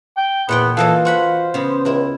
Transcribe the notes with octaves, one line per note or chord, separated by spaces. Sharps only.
G5
E2 A#2 B3 F#5 G5
E3 A#3 F4 A4 D#5
F#4 C5 F#5 B5
C#3 B3
C#2 E4 A#4